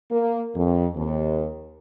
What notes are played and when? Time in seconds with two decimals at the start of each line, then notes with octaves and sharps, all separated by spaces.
0.10 A#3
0.55 F2
0.96 D#2